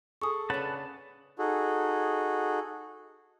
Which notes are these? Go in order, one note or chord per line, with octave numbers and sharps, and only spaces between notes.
G#4 A4 C#6 D#6
C#3 D4 B4 F#5 A5
D#4 F#4 G#4 A4